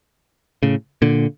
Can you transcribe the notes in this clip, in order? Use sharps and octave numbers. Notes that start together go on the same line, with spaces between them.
A2 C#3
A#2 D3